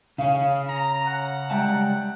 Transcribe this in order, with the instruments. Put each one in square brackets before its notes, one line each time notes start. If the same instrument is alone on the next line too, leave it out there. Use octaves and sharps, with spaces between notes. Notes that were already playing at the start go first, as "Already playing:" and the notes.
[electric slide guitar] C#3 C#4 [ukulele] F5 G#5
[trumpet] A#5
F#5
[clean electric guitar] G3 G#3 A5 [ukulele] E5 G5 A#5